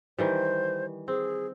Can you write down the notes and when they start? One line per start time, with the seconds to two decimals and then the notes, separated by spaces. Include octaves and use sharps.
0.19 D#3 E3 G3 C5
1.08 C4 G#4